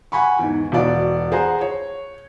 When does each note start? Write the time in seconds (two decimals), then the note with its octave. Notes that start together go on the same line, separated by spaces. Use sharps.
0.12 F#5 G#5 B5 C#6
0.39 E2 G#2
0.72 E1 B2 F#4 D5
1.32 G#4 C5 F#5 A#5
1.61 C#5